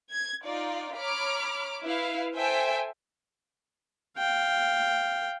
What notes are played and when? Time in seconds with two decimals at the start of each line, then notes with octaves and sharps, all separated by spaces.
0.12 G#6
0.45 D#4 F4 D5
0.95 C#5 A#5 B5 D6 F6
1.82 E4 B4 F5
2.35 A4 C5 E5 G5 G#5
4.18 F5 G5